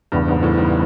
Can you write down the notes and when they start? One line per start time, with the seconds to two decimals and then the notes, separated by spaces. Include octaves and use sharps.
0.12 E2 G2 C#3 E3 G3 B3
0.28 G#2
0.43 A2
0.57 G#2